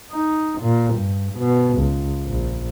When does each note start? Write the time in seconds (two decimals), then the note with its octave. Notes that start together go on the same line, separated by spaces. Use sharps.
0.11 D#4
0.62 A#2
0.94 G2
1.39 B2
1.78 C#2
2.26 A#1